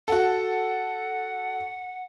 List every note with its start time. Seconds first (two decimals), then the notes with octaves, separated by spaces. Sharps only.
0.08 F#4 A4 F#5